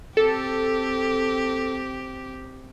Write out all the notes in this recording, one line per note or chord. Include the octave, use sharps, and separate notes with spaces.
C4 G4 A4